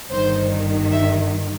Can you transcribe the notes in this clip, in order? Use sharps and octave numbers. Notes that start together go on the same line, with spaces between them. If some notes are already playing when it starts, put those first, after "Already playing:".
G1 G2 D#3 C5
E5